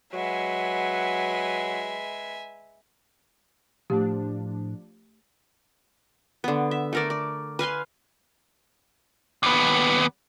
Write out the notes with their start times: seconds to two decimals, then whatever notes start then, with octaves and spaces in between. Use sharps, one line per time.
0.13 F#3 G#3 B4 E5 F#5 G#5
3.90 A2 F3 A3 D4 G4
6.44 D3 B3
6.71 E5
6.93 A3 A#4 D5
7.10 D5
7.59 B4 F5 G#5 C6
9.43 D#2 B3